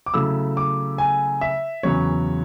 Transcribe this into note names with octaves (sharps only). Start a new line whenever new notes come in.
D6
C#3 F#3 A3 E4 E6
D6
G#5
E5
E2 C#3 F#3 C#4 C#5